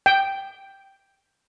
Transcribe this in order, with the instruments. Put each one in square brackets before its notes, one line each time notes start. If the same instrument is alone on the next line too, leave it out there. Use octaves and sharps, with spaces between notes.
[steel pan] G5